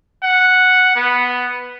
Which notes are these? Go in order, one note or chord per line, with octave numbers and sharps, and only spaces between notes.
F#5
B3